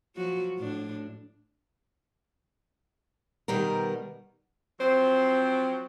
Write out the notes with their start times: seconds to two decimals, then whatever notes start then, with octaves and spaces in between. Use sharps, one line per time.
0.16 F3 F#3 F#4
0.58 A2 D4
3.48 B2 D#3 G3 B3 A#4
4.80 F3 F#3 C4 C5